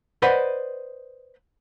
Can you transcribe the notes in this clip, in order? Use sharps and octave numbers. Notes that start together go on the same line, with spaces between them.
B4 C5 D5 D#5 F#5 B5